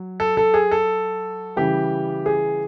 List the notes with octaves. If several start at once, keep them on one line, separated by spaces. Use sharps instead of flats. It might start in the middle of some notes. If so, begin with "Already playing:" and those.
Already playing: F#3
A4
A4
G#4
A4
C#3 E3 G3 G4
G#4